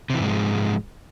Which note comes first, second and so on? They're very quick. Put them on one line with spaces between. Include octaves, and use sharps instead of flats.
C3 E3 G#2 G#3 F3